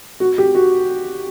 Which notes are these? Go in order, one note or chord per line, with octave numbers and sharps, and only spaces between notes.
F#4
G4
F#4